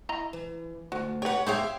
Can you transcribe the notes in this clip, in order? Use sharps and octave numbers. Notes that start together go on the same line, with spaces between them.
E4 D#5 A#5
E3
D2 F#4
G4 B4 C#5 F#5
C4 G4 G#4 C#5 E5 F5